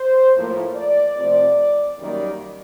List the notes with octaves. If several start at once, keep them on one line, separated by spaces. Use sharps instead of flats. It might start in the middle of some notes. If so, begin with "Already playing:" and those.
Already playing: C5
A2 F3 A#3
D5
F2 C3 F3 A3 C4 D5
F#2 D#3 G3 A#3 D5